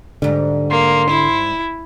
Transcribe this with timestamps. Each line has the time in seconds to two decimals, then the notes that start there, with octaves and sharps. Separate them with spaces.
0.22 G#2 D3 G3
0.71 A#3 C6
1.10 E4